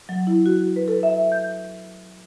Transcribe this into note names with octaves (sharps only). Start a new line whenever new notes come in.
F#3
E4
F#4
B4
A4
E5
G6